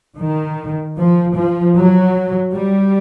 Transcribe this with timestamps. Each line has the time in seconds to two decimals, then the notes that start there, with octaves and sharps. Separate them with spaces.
0.18 D#3
0.97 F3
1.36 F3
1.77 F#3
2.55 G3